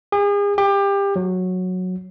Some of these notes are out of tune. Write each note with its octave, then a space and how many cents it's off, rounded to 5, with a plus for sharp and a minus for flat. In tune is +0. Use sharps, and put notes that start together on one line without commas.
G#4 -40
G4 +25
F#3 -10